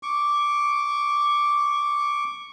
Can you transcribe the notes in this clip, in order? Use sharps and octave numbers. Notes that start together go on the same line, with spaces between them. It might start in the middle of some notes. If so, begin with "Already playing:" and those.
C#6 D6